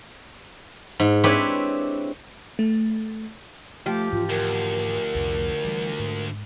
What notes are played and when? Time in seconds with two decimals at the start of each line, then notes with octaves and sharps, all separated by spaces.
1.00 G#2
1.24 C4 D4 E4 G4 B4 C#5
2.59 A3
3.86 F3 A3 G4
4.12 G#2 E3 C#4 F4
4.29 D2 A#4
5.15 C2 F2
5.64 E3 G3
5.99 G#2